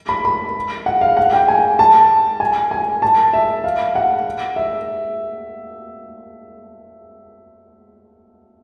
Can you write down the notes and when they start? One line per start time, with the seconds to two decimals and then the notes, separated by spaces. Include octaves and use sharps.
0.09 B5
0.25 B5
0.86 F#5
1.01 F5
1.17 F#5
1.33 G5
1.48 G#5
1.79 A5
2.40 G#5
2.71 G#5
3.02 A5
3.33 E5
3.64 F5
3.95 F#5
4.56 E5